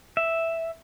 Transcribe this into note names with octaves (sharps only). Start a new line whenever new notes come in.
E5